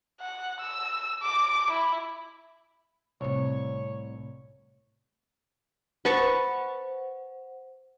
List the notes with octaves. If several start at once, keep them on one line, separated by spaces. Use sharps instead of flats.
F#5
E6
D6
E4
C2 A2 C3 C#5
B4 C5 F#5 A5 C#6